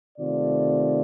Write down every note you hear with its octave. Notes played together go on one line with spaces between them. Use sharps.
C3 D#3 A3 C4 F4 D5